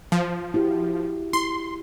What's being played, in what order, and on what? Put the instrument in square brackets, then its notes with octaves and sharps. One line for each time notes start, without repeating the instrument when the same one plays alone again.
[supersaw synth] F3
[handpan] E4 F#4 G4
[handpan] E4 [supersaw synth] C6